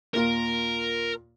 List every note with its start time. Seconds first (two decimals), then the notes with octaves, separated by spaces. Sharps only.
0.14 D#2 A#2 F4 A#4